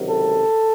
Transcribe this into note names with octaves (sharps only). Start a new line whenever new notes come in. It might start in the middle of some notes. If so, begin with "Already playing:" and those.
Already playing: C#2 C3 D#3 F#3
A4